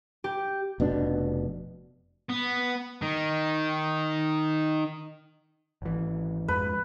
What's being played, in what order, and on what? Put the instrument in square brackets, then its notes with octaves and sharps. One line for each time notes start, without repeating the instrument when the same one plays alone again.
[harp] G4
[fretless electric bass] F1 B2 D4
[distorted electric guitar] B3
D#3
[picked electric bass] G#1 E3
[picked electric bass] F2 G#2 [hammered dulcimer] B4